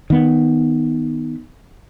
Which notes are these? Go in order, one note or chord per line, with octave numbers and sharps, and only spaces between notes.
D#3 B3